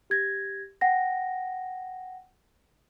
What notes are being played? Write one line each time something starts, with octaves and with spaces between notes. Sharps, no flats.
G4 G#6 A#6
F#5 G5 A#6